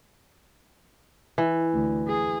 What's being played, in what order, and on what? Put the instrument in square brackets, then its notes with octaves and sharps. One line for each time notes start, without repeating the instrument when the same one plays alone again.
[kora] E3
[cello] D2
G#4